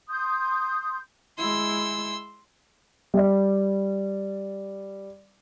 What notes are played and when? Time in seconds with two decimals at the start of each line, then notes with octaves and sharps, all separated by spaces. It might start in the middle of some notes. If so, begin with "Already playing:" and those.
0.09 C6 D#6 G6
1.38 G#3 E4 C6 E6
3.14 G3 D5